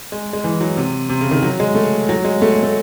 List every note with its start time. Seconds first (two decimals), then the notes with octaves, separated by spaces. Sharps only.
0.12 G#3
0.33 G#3
0.44 E3
0.61 F#3
0.77 C3
1.09 C3
1.21 C#3
1.31 D#3
1.42 F#3
1.60 G#3
1.75 A3
2.09 F#3
2.24 G#3
2.42 A3
2.52 G#3
2.63 A3